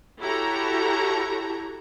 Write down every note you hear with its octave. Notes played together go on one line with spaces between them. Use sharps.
E4 F#4 G4 A4 C#5 A#5